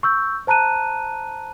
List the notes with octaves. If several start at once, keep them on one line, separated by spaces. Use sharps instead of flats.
C#6 E6 G6
C5 A5 A#5 F#6 D#7